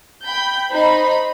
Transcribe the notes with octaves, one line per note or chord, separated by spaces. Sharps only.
G5 B5 G6
D#4 C5 B5